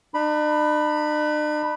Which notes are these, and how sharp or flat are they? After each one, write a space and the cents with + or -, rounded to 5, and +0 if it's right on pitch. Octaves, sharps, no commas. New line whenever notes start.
D4 +45 B5 -5